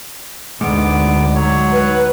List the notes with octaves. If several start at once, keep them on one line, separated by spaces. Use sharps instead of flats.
D2 G#2 D3 B3 D6
F#3 C#5
B4